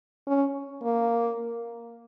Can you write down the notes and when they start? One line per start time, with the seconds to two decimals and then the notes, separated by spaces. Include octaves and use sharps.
0.27 C#4
0.83 A#3